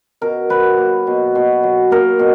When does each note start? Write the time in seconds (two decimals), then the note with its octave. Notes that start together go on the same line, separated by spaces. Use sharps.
0.21 B2 A#4
0.49 F#3 B4
0.78 A#3
1.07 B2
1.35 B2
1.63 F#3
1.91 A#3 A#4
2.19 B2